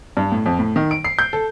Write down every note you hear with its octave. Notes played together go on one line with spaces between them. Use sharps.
G2
A2
F2
A2
D#3
D7
C7
G6
A4